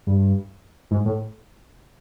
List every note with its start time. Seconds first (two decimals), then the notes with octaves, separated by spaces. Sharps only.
0.07 G2
0.91 G#2
1.06 A2